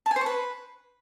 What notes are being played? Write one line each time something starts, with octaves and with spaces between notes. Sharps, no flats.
A5
G#5
C5
C#6
B4